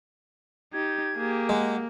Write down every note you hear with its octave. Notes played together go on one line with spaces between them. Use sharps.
D#4 G4 G#6
A#3 G4 G#4
G#3 F#5